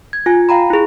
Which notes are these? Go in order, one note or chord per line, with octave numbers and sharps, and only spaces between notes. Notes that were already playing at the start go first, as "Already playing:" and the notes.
G#6
F4 G#5
F5 G5 A#5 B5
E4 G#4